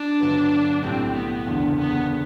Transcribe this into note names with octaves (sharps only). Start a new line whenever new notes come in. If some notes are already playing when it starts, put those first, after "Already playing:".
Already playing: D4
G1 G2 F#3 B3
B1 A2 G3 C4
B3
F#1 E2 D3
B3